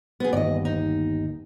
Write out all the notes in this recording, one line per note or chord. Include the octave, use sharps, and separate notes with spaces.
B3 G#4
G1 D#2 D5 D#5
D#4